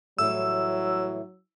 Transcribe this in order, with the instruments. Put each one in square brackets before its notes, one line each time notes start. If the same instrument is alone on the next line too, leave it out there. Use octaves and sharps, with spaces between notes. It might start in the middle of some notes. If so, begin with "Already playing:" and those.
[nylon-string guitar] A2 E3 G3 [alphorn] F#3 [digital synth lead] E6